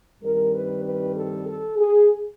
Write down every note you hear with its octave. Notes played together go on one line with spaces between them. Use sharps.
G2 D#3 G3 C4 A#4
B4
B4
A4
A4
G#4